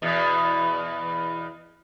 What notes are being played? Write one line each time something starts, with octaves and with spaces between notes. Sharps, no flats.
E2 B2